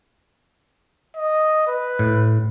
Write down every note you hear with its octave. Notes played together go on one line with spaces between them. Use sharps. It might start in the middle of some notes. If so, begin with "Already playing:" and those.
D#5
B4
A2